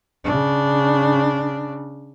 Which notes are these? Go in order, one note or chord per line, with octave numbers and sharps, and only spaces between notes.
C#3 D4